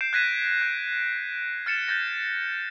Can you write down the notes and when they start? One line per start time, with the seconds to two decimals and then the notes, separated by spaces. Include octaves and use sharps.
0.01 G6 C7 D7 E7
0.13 F#6 G#6 A#6 B6 D#7 E7
0.62 G6
1.66 F6 A6 C#7 E7
1.88 G6 A6 A#6